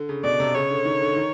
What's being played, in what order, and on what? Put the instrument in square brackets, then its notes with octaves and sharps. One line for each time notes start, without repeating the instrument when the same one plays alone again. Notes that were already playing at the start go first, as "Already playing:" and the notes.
Already playing: [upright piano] D3
C#3
[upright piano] B2 [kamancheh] D5
[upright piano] C3
[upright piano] C#3 [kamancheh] C#5
[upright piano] D3
D#3
D3
D#3